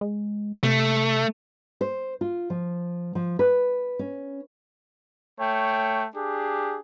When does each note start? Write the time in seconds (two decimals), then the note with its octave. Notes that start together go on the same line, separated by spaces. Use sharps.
0.01 G#3
0.63 C3 A3
1.81 C5
2.21 F4
2.50 F3
3.15 F3
3.39 B4
3.99 C#4
5.40 A3 C#5 G5
6.16 D4 G4 G#4